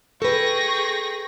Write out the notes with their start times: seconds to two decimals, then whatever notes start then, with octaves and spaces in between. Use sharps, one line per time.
0.22 G#4 A4 B4 G5 C#6 A#6